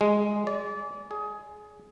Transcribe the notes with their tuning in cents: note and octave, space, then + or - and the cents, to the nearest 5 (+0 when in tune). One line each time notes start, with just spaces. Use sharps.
G#3 +0
D5 -30
G#4 +15